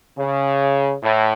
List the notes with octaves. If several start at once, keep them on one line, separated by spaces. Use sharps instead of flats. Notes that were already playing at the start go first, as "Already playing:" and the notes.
C#3
A2